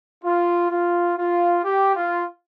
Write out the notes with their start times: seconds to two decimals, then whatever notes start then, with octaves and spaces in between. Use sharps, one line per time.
0.24 F4
0.71 F4
1.18 F4
1.64 G4
1.96 F4